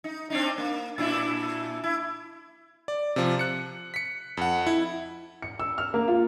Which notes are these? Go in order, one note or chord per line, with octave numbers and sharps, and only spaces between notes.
D#4
C4 D4 D#4
A#3
A#2 D4 E4
E4
D5
C3 F3
F#6 C#7
B6 C#7
F2 F#5
E4
C#7
E6
F6
A#3
F4